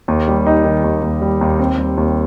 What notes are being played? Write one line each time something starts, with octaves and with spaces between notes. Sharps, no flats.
D#2
G3
D#4
D#3
D#2
D#2
G3
D#2
C4
G3
D#2